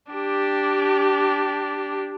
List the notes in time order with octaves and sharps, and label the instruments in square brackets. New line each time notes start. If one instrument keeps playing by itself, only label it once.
[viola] D4 G4